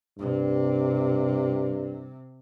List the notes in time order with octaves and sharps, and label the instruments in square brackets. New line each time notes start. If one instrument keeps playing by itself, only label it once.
[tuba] G2 [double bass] C3